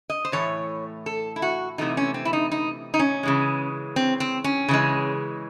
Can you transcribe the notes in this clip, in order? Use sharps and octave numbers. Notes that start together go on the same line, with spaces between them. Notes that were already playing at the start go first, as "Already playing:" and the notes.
D#5
C5
A2 E3 A3 C#5
A4
E4
F#4
C3 E3 A3 D#4
C#4
C4
E4
D#4
D#4
D#4
C#4
C#3 E3 G#3
C4
C4
C#4
C#3 E3 G#3